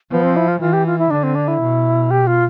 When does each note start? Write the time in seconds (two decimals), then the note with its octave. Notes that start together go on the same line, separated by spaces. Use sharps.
0.11 F3 B3
0.23 C4
0.36 E4
0.48 F4
0.60 E3 F4
0.73 G4
0.86 F4
0.98 E4
1.10 D3 D4
1.23 C4
1.35 D4
1.48 E4
1.61 B2
2.11 G4
2.27 F4